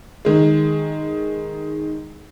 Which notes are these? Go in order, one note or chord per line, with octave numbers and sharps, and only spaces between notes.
D#3 G#3